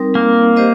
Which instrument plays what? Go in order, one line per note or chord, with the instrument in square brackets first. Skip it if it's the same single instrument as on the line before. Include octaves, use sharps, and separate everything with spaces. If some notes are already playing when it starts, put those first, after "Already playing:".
Already playing: [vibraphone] G3 C4 D#4 A#4
[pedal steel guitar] A#3
[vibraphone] G4 C5 D#5